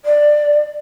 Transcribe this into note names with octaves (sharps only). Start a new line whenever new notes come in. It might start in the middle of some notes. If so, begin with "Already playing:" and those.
D5